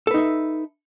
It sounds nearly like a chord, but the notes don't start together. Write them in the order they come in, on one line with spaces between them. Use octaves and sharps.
A4 B4 D#4 E5